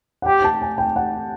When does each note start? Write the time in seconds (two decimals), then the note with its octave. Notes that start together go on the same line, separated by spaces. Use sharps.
0.22 F#5
0.26 G4 G5
0.44 A5
0.62 G#5
0.78 G5
0.96 F#5